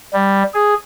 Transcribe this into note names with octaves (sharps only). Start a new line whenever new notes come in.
G3
G#4